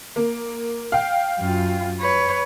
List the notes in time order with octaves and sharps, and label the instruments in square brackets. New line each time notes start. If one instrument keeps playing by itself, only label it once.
[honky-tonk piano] A#3
F5 G5
[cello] F#2 F4
B4 C#5